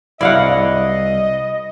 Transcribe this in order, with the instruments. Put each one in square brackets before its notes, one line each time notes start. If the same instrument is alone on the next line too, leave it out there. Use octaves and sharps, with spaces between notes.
[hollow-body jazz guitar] C2 D5 [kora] E4 F5 F#5 [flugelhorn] D#5